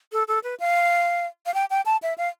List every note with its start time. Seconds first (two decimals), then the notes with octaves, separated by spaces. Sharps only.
0.12 A4
0.28 A4
0.44 B4
0.60 F5
1.46 F5
1.54 G5
1.70 G5
1.86 A5
2.03 E5
2.18 F5